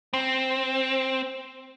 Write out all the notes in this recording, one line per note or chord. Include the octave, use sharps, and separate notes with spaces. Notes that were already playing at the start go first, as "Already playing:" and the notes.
C4